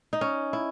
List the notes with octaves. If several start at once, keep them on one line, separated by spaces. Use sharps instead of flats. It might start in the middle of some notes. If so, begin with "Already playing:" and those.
D#4
C#4
E4